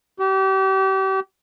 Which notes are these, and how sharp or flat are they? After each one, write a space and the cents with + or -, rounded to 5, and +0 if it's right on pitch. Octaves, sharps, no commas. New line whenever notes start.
G4 -35